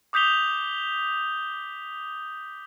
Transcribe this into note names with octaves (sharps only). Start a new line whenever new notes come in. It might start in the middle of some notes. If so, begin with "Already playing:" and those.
D6 D#6 G6 B6 F7 G7